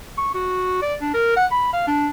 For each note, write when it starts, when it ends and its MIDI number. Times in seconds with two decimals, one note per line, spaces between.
0.18 0.30 85
0.34 0.79 66
0.82 0.94 74
1.01 1.12 62
1.14 1.33 70
1.36 1.46 78
1.51 1.71 83
1.73 1.85 77
1.87 2.09 62